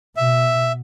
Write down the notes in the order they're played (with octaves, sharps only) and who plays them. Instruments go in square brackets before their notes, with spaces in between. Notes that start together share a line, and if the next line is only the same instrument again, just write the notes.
[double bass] B2 [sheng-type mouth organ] E5